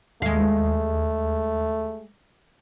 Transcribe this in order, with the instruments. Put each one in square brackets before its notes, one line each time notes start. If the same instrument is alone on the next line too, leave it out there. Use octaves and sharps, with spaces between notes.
[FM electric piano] D#2 [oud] G#3 F5 [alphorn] A3